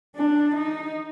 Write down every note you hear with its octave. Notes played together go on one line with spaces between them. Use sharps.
D4
D#4